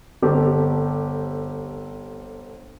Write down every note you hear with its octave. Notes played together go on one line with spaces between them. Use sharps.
G1 C4 G4 A4